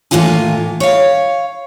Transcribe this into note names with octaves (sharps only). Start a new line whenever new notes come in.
A2 E3 A#3 F4 G#5
C#5 F5